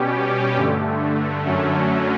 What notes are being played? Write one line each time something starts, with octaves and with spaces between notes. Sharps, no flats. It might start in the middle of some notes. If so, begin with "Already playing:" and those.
Already playing: B2 G3 C#4 G4
G2 D3 A3
F#2 D3 F#3 A3 C#4